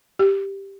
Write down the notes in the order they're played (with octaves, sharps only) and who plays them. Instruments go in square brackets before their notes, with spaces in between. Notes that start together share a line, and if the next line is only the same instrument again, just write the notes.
[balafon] G4